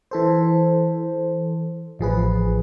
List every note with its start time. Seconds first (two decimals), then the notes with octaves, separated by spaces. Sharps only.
0.11 E3 A4 C5
1.99 A1 F3 G#4 B4